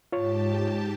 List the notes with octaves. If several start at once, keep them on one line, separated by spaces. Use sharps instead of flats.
G#2 F4 G4 C#5 A5